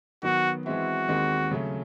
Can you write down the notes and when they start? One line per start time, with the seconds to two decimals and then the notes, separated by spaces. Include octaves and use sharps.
0.23 D#3 F#3 B3 F#4
0.66 E3 G#3 C4 E4 F#4
1.08 D#2 D#3 G#3 C4
1.51 C#3 F#3 A3 C#4